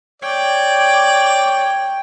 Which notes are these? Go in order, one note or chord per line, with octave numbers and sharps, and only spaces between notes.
C#5 D5 G5